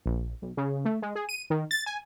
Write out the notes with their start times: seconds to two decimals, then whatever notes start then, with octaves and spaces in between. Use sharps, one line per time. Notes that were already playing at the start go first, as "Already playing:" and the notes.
0.06 A#1
0.42 B1
0.57 C#3
0.85 A3
1.02 G#3
1.15 G#4
1.29 D#7
1.50 D#3
1.71 A6
1.86 G#5